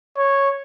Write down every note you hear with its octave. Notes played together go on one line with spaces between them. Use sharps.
C#5